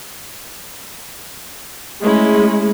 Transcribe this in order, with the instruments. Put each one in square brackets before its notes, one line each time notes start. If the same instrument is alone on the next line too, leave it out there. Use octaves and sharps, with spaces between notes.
[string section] G#3 [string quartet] A3 C#4 E4